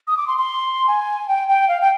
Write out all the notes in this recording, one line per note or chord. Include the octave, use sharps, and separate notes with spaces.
D#6
D6
C6
C6
G#5
G5
G5
F5
G5